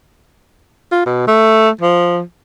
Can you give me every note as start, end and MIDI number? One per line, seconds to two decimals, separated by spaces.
0.92 1.03 65
1.06 1.26 47
1.27 1.70 57
1.81 2.20 53